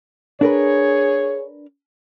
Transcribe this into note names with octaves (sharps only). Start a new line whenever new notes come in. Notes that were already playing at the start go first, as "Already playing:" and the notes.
D4 G#4 A#4 B4 C#5